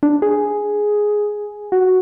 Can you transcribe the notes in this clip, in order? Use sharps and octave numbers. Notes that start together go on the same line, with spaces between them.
D4
G#4
F#4